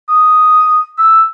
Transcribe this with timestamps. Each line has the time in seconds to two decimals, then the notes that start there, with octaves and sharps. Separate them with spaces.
0.09 D#6
0.98 E6